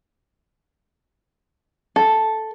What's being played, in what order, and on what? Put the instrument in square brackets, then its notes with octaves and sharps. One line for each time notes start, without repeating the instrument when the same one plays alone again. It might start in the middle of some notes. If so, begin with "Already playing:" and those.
[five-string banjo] A4